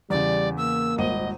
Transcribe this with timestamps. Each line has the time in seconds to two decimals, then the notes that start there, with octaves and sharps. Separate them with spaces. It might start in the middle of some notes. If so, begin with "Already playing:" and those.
0.10 E2 C#3 G3 D5
0.57 A#3 E6
0.98 D#1 G#1 D#5 D#7